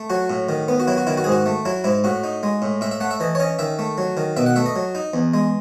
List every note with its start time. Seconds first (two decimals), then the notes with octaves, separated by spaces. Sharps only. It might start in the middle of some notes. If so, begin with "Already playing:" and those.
Already playing: A3
0.10 F#3 F#4
0.30 A2
0.49 D#3
0.68 B3
0.80 F#4
0.88 F#3 E4
0.97 F#4
1.07 D#3 E4
1.17 F#4
1.24 G#2 G#4
1.32 F#4
1.46 A3
1.65 F#3 E4
1.84 G#2 E4
2.04 A2 F#4
2.24 D#4
2.43 G#3
2.62 A2
2.81 A2 E5
2.91 E5
3.00 A3 F#5
3.11 E5
3.20 E3 D#5
3.35 C#5
3.40 C#4 D#5
3.59 D#3 E5
3.79 A3
3.98 F#3
4.17 D#3
4.37 B2 E5
4.46 F#5
4.56 A3 E5
4.66 D#5
4.76 F#3
4.95 D#4
5.14 E2
5.34 G#3